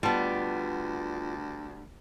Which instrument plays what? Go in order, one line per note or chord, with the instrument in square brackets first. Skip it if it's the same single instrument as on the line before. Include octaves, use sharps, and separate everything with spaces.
[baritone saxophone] D2 [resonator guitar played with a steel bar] G3 B3 [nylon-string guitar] F4 D#5 A5